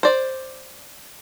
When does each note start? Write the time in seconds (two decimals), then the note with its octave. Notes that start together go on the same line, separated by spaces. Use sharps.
0.03 C5 D5